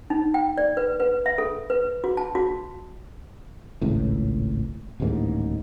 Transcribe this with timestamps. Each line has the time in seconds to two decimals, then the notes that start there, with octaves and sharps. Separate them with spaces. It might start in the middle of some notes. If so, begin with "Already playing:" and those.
0.10 D#4
0.34 G5
0.58 D5
0.77 B4
1.00 B4
1.26 E5
1.38 A4
1.70 B4
2.04 F#4
2.17 A5
2.35 F#4
3.81 G#1 C#2 A2
5.00 D1 A1 D#2 G#2